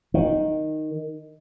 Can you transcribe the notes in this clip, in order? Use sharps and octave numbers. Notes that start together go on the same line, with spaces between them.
D#3